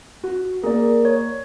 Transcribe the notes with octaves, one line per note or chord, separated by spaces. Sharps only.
F#4
A#3 G#4 A#4 D5
C#5